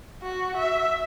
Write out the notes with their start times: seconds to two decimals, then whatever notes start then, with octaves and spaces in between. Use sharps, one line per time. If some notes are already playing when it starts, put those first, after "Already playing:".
0.23 F#4
0.57 E5